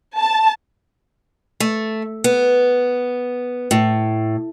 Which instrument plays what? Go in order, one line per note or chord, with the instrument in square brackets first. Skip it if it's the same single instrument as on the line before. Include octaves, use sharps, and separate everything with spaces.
[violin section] A5
[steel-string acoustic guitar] A3
B3
A2